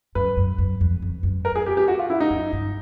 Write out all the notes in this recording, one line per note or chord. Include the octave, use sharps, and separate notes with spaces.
F#2 B4
F#2
F#2
F2
F2
F#2
A#4
G#4
G4
G4
F#4
F4
E4
D#4
F#2
G2